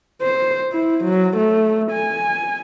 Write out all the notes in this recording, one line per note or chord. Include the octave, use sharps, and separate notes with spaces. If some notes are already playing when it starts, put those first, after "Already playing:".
C5
E4
F#3
A3
G#5